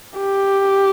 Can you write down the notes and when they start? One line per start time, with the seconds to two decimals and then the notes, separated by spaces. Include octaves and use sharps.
0.18 G4